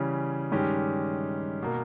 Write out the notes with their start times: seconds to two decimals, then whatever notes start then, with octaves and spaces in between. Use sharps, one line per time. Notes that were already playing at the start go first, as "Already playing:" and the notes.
Already playing: C#3 E3 G3 C#4 G#4
0.52 G2 D#3 G#3 C#4 G4
1.63 B2 A#3